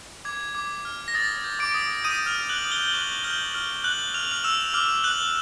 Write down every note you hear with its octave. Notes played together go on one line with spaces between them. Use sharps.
D6 G#6
D6
F6
A#6
D#6 A6
G6
D6 D7
D#6
D#6 G6 D#7
F6 F7
D#6
F#6 F#7
D#6
G6 G7
G7
C#6 F#6 F#7
F6 G6 G7
F6
F6 F#6 F#7
F6 F7
F#7
F6 F7
E6 F6 E7
D6 F6 F7
F#6 F#7